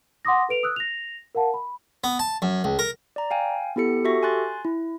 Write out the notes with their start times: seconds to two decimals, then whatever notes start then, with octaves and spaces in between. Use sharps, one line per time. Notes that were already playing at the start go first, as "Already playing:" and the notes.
0.25 F#5 C6 D6 D#6 A#6
0.49 A4 B4 D7 F7
0.63 D#6 E6 F#6
0.76 A#6 F7
1.35 A#4 F5 F#5 A5
1.54 B5
2.04 B3
2.19 A5
2.42 F#2
2.64 C#2
2.79 A#4
3.16 D5 A#5
3.31 F5 G5 G#5
3.76 B3 E4 G4 A4 C#7
4.05 F#4 G4 A4 E5 C#6 A#6
4.23 G#5 C6 F#6 A6
4.65 E4